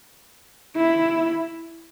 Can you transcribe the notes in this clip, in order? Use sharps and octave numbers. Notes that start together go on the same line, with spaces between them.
E4